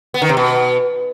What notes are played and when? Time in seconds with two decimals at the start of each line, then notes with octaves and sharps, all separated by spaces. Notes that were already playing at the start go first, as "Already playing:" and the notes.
0.14 B3
0.22 D#3
0.29 C3
0.37 B2